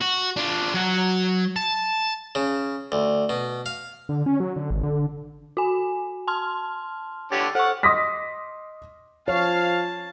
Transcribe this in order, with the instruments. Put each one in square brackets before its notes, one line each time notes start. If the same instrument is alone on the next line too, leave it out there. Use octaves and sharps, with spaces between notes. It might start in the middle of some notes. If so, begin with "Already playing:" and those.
[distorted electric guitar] F#4
D4 F4
F#3 F#5
A5
[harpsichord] C#3
D2
B2
F5
[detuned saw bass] D3
C#4
F#3
D3
G#1
D3
[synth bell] F#4 G#5
A5 C6 F6
[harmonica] D3 G4 C#5 [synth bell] A6
[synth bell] A4 C#6 [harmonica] F#5
[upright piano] D#5 C6 D6 D#6 A#6 B6
[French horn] F3 [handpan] C#5 [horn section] F5 [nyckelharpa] A5